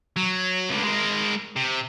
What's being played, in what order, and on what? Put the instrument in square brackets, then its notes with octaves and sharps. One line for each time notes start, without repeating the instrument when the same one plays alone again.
[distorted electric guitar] F#3
C#2 D3
G#3 A#4
C3